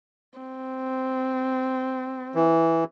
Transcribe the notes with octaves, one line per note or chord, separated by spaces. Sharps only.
C4
E3